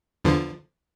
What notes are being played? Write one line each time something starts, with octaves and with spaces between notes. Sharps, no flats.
E2 D3 F3